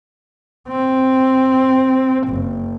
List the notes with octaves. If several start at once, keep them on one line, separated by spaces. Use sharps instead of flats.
C4
F#1